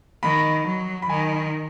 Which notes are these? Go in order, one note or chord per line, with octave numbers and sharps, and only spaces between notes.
D#3 B5
F#3
B5
D#3 G#5